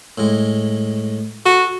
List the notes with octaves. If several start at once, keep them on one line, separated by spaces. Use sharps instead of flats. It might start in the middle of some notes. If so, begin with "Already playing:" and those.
A2 G#3
F#4 A4